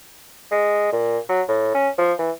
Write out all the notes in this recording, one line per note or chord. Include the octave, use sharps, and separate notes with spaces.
G#3
A#2
F#3
A2
C#4
F3
E3